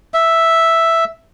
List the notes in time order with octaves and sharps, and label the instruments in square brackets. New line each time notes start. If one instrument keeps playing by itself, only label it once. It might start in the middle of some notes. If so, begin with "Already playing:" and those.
[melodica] E5